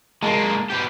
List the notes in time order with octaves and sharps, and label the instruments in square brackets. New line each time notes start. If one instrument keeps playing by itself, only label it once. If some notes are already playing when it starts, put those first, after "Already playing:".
[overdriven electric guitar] G#3 A#3 [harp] A5 C6
[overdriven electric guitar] B2 G4